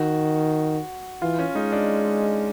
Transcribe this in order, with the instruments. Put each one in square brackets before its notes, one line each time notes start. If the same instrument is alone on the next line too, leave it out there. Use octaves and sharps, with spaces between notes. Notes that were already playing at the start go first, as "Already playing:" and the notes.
Already playing: [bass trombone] D#3 [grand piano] F#4
[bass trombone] E3 [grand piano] F4
[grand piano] C#4
[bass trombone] G#3 [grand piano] D#4
[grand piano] D4